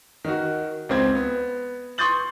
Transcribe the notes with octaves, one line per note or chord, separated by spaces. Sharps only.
D#3 F#4
C#2 C4 G#6
B3
C6 C#6 D#6 G6 A6 F#7